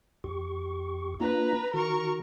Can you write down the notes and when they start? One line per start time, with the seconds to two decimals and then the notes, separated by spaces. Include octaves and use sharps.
0.24 F2 G4 C#6
1.20 A#3 D4 F4 B4 A#5
1.74 D#3 F#4 A#4 C#6